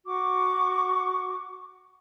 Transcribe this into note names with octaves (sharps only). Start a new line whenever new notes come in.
F#4 C#6 D6